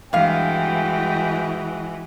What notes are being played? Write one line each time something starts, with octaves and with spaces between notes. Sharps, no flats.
G2 E3 G#3 F#4 F5 G5